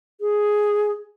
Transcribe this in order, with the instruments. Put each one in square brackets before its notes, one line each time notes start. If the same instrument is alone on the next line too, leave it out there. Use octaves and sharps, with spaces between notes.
[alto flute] G#4